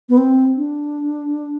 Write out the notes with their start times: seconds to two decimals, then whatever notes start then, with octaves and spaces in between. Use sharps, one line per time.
0.09 B3
0.17 C4
0.57 D4